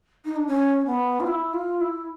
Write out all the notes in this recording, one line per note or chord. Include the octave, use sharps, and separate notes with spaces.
D#4
D4
C#4
B3
F4
E4
F4
E4